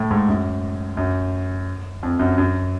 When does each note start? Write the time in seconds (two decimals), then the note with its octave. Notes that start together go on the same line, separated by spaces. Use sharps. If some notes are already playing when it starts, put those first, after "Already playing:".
Already playing: A2
0.11 G#2
0.28 F#2
0.97 F#2
2.03 F2
2.19 F#2
2.38 F#2